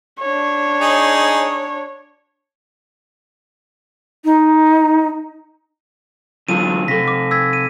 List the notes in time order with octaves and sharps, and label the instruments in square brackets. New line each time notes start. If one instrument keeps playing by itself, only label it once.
[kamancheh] D4 C#5
[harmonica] D#4 G#4
[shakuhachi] D#4
[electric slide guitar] D3 F#3 F4 [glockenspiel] D#7
[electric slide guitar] C3 A4 [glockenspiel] A#6 B6
[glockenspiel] D6
E6 G#6 B6
D#7